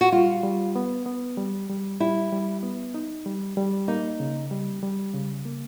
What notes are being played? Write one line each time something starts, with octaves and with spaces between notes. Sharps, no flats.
F#4
G3 F4
G3
B3
B3
G3
G3
G3 E4
G3
B3
D#4
G3
G3
A#3 D#4
C#3
G3
G3
C#3
A#3